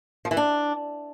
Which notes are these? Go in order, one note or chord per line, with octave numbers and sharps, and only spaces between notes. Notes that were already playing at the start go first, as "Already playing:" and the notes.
F3
E3
D4